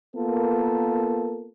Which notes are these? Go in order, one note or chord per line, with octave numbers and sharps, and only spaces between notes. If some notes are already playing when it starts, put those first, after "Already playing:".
A#3 B3 F4 A4 A#4